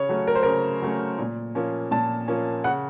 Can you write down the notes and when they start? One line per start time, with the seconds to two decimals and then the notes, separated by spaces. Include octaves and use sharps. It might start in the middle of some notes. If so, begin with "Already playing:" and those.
Already playing: C#3 C#5
0.09 F#3 A3 C#4
0.27 A#4
0.35 C5
0.43 C#3 A#4
0.82 F#3 A3 C#4
1.19 A#2
1.55 F3 A#3 C#4
1.91 A#2 A5
2.28 F3 A#3 C#4
2.64 C#3 F#5